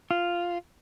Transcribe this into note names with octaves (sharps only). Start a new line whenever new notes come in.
F4